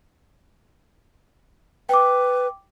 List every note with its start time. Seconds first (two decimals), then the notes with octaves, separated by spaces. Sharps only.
1.89 B4 G5 D6